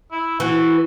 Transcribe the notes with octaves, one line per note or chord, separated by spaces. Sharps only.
E4
E3 F#4